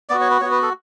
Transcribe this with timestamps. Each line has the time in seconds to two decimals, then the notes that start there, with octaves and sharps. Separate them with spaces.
0.09 B3 F#4 D5
0.21 C#5
0.31 B4
0.41 B3 F#4 C#5
0.51 B4
0.63 A4